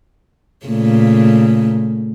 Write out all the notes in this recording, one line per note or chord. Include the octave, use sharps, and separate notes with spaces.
A#2 C#3 A3